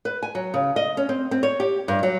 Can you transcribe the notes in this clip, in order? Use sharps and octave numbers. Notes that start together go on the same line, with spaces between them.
B4
G#5
F#3
C#3
D#5
C#4
C4
C4
C#5
G4
G2
F#3